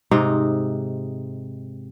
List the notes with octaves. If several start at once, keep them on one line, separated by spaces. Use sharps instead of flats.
G#2 C3 D#4